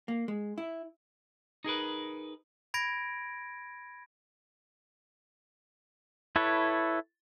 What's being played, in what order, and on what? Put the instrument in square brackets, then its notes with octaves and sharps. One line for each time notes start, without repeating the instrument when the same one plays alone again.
[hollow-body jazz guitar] A#3
G#3
E4
[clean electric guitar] D#4 G#4 A#4 B4
[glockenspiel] B5 G#6 A#6 D7
[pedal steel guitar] E4 A4 B4 C#5